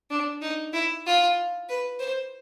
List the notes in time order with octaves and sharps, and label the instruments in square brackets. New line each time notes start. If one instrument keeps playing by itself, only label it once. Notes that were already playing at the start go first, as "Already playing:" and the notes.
[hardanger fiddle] D4
D#4
E4
F4
B4
C5